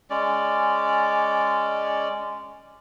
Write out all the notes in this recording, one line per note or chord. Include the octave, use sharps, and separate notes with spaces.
G#3 C#4 D5